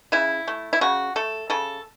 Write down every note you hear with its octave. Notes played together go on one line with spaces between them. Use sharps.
C#3 E4
A3
E4
C#3 F#4
A3 A4
C#3 A4